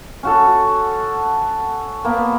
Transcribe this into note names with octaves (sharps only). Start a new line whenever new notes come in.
C#4 F#4 A4
A#3 B3 G5